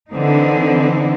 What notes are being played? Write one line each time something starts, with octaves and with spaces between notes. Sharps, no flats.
D3 E3 C4 D#4